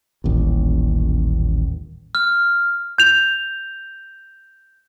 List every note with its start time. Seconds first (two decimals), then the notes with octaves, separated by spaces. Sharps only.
0.24 D#1 A1 D#2
2.15 F6
2.98 G6 F7